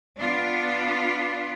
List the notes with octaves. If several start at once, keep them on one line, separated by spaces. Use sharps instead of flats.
B3 D4 F4